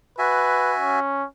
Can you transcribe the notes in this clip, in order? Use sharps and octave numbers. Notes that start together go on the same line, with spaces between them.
F#4 B4 E5 G#5
C#4